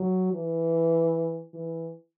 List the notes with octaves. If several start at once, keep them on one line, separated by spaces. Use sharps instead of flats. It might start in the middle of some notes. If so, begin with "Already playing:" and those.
Already playing: F#3
E3
E3